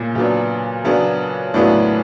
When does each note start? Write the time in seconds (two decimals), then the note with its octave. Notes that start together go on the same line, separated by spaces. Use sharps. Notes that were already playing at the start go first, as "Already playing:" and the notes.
Already playing: A#2 C#3
0.15 C#3 F#3 B3 D4
0.85 C#3 F#3 B3 D4
1.54 A2 C#3 F#3 B3 D4